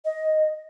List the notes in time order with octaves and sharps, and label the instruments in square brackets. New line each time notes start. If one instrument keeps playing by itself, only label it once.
[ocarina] D#5